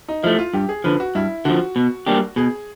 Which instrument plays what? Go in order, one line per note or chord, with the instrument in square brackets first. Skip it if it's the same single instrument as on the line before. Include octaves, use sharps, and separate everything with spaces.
[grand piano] D#4
[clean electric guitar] F3 A3 [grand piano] E4
[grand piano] F4
[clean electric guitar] G2 [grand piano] G4
[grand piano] G#4
[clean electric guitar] D3 F3 [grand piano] B4
[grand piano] F#4
[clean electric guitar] G2 [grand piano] E4
[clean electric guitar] D3 F3 [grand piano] F#4
[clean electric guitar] B2
G3 A#3 D4 G4
[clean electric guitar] B2 [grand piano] G#4